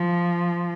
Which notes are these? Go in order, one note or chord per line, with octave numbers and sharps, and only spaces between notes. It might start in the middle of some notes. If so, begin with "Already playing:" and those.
Already playing: F3